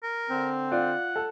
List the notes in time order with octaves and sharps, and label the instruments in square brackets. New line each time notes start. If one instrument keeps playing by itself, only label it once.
[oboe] A#4
[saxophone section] D3 C4
[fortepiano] F4 D5 [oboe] F#5
[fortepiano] A4